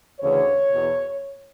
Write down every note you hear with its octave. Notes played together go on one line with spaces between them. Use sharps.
D2 C#3 E3 C#5
E2 B2